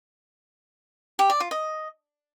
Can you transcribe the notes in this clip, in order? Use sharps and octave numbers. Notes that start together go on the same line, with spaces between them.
G4
D5
F4
D#5